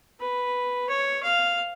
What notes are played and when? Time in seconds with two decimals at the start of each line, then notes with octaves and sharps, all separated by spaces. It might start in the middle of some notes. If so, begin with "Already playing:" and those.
0.20 B4
0.89 C#5
1.23 F5